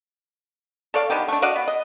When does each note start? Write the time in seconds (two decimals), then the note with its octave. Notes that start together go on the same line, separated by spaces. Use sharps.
0.94 A4 C#5 D5 F5
1.10 D3 D#3 B3 G4
1.28 A3 D4
1.42 F#4 D5 D#5 F5
1.56 B3
1.68 D#5